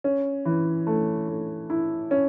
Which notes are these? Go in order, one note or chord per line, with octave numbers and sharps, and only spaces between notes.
C#4
E3
A3
A3
E4
C#4